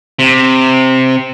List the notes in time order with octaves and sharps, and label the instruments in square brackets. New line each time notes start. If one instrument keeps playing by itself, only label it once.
[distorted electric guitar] C3